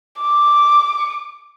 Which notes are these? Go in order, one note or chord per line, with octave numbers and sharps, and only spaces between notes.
D6